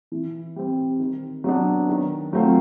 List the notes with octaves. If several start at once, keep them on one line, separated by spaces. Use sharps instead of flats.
E3
G3 C4
D#3
F#3 B3 D4
D#3
F#3 A3 C4 F4